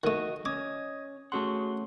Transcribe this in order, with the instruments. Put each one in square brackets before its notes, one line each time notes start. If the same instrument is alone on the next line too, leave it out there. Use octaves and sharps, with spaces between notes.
[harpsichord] D#3 A3 [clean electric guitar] F#4 D#5
[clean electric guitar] C#4 [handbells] D#5 D#6 G#6 [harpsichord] D6
[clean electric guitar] A3 C#4 F#5 [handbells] F#4 G#4 C6